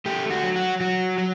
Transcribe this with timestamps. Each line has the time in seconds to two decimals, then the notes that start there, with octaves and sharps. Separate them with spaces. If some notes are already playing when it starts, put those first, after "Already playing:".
0.06 A3 G4
0.30 F#4
0.43 F#3
0.56 F#4
0.80 F#3 F#4
1.18 F#3